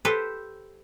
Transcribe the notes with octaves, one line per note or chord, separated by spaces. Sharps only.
G4 A4 B4 C5